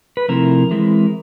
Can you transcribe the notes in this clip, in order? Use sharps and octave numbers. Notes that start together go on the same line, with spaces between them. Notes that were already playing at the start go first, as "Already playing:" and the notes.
B4
C3 F3 A3 C4 E4 A#4
E3 G#3 C4 E4